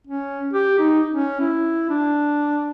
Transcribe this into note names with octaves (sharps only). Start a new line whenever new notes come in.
C#4
G4
D#4
C#4
E4
D4